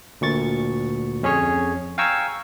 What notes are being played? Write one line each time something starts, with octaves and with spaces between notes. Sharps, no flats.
D2 A#2 C#6 A6
F2 C#4 G#4 C#5
F5 G5 G#5 A#5 C#6 E6